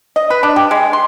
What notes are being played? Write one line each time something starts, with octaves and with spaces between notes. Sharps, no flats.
D#5
B4
D4
G4
G#3
C6